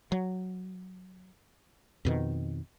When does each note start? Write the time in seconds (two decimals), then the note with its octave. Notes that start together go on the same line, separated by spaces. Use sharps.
0.12 F#3
2.05 F2 B2 D#3